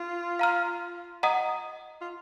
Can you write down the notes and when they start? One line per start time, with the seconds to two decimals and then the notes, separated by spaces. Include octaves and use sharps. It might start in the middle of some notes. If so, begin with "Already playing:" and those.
Already playing: F4
0.39 F5 A#5 F6
1.23 D#5 F#5 A#5 D#6
2.01 F4